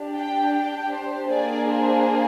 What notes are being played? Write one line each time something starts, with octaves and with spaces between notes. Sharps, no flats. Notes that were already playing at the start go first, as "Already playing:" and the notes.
Already playing: D4 G4
G5
G5
C5
A#3 D4 G#4 D5
C5